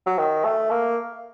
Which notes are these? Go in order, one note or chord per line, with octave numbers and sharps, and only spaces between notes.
F#3
D#3
A3
A#3